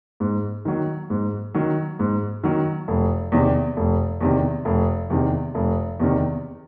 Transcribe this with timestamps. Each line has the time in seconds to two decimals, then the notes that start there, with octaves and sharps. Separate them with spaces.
0.20 G#2
0.65 D#3 F#3
1.10 G#2
1.54 D#3 F#3
1.99 G#2
2.44 D#3 F#3
2.88 F1
3.32 E2 C3 D#3
3.77 F1
4.21 E2 C3 D#3
4.65 F1
5.10 E2 C3 D#3
5.55 F1
6.00 E2 C3 D#3